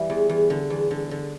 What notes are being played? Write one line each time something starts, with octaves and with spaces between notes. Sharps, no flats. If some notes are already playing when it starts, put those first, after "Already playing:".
Already playing: E3 G3
E2
E2
D3
E2
D3
D3